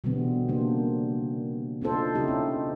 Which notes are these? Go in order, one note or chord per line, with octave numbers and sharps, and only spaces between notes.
B2 D3 E3 G3 B3 C4
C#3 G3 A#3 D4 C5
C4 D4 D#4 F4 A4 C5
C#3 C#4 D#4 E4 G4 D#5
C4